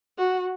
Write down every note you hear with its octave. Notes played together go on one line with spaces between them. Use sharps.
F#4